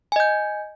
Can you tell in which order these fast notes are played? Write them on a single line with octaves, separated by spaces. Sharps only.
G#5 D#5 G6